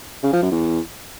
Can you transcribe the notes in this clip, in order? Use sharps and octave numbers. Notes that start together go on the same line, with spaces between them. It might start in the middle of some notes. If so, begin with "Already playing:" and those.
C#3
F3
F#2
E2